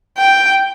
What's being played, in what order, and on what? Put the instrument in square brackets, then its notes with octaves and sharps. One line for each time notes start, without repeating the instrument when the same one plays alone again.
[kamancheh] G5